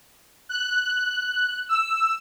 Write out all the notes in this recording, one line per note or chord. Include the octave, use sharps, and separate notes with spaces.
F#6
E6